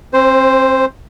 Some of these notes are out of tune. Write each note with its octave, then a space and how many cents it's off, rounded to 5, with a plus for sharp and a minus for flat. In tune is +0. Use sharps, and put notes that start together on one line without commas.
C4 +35 C5 +0